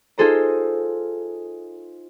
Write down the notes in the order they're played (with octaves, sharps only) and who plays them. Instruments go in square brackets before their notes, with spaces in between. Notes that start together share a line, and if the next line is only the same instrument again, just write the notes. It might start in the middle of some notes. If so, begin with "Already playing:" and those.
[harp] D#4 F4 G#4 A4 C5 A#5